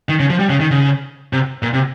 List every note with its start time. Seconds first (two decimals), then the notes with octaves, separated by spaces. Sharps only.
0.09 D#3
0.20 C#3
0.30 F3
0.39 G3
0.50 C#3
0.60 D#3
0.71 C#3
1.33 C3
1.63 A#2
1.73 C3